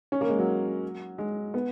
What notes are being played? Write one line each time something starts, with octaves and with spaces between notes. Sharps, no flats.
C#4
A#3
G#3
F#3
G#3
B3